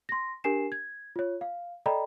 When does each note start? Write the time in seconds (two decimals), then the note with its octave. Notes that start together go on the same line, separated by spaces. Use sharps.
0.09 C6 A#6
0.44 D4 G4 A#4 G#5 C7 E7
0.72 G#6
1.16 F4 C#5
1.41 F5
1.86 A4 D5 D#5 G5 A#5 B5